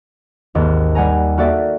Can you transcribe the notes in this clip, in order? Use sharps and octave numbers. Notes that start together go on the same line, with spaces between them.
G#1 D#2
G3 F#5 G#5 A#5
A#3 F#4 A4 D5 E5